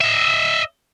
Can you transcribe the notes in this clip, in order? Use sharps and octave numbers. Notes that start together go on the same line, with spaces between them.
D#5 E5